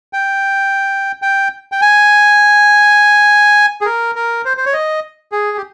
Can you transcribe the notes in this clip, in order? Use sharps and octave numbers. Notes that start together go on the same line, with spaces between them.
G5
G5
G5
G#5
G#4
A#4
A#4
C5
C5
C#5
D#5
G#4
G4